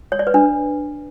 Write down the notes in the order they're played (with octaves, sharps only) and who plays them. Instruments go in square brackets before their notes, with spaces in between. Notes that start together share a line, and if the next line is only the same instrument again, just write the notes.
[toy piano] C#5
D5
B4
D4